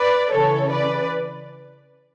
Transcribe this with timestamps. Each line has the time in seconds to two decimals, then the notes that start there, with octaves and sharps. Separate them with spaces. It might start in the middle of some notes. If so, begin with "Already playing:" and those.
Already playing: B4 D5
0.32 C#3 E3 A4 C#5
0.70 B4 D5